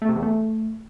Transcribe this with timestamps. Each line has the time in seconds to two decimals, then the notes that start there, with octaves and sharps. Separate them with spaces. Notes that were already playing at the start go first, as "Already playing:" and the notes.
0.02 A3
0.09 C3
0.16 E2
0.23 A3